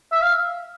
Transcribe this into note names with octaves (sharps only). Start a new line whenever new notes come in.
E5
F5